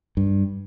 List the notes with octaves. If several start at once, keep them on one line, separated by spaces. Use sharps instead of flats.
G2